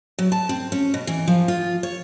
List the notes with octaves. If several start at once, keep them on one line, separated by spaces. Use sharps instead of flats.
F#3
A5
C4
C#4
B2
E3
F3
F4
C#5